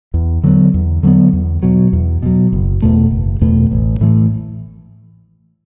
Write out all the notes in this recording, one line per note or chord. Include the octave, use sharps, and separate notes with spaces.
E2
D3 F#3 B3
E2
D3 F#3 B3
E2
B2 F#3
E2
B2 F#3
F#1
E2 B2 A3
F#1
E2 B2 A3
A1
A2 E3 A3